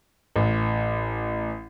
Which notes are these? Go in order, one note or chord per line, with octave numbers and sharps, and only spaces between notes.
A1